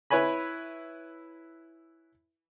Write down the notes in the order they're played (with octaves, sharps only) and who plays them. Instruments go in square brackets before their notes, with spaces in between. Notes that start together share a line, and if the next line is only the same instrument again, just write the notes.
[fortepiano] E4 B4 C#5 G#5 B5